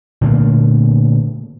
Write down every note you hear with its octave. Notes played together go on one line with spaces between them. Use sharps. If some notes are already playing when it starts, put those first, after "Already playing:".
A#2 D3 A3 A#3